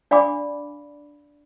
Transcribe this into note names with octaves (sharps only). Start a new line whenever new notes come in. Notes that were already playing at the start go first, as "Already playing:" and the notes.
D4 D5 F5 G#5 B5 D6